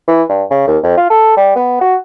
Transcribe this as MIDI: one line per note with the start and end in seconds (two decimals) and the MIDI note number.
0.08 0.23 52
0.29 0.43 43
0.51 0.64 49
0.68 0.78 39
0.83 0.93 41
0.97 1.09 65
1.10 1.34 69
1.37 1.51 55
1.56 1.81 59
1.81 1.95 66